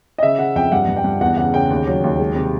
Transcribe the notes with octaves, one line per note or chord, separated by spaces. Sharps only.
D#5
C#3 E5
C#3 F#5
F2 G5
G2 F#5
G2
G5
G2
E2 F#5
C#3 F#5
C#3 G5
D#2
F#3
D#2
G#3
C3